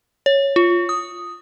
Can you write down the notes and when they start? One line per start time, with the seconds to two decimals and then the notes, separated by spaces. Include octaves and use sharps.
0.26 C#5
0.56 F4
0.89 D#6